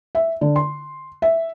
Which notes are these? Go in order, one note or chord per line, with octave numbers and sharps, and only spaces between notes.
E5
D3
C6
E5